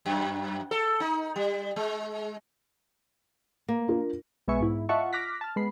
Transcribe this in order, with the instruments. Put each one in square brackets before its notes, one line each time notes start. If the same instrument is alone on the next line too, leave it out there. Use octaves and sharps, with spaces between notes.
[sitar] F#2
A4
D#4
G3
G#3
[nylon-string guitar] A#3
[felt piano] D4 F4 A#4
[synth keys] B1 G#3 B3 E5 G#5 C#6
G#2 E4
F4 D#5 E5 F#5 A5 C#6
D6 F6 F#6 A#6 B6
A5 F6
G#3 B3 B5 C7